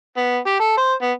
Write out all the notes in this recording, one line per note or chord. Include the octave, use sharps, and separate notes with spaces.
B3
G4
A4
C5
B3